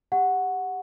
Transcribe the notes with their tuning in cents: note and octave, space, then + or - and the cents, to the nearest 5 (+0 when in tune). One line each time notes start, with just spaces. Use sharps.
G4 +15 F#5 -5 C#6 +0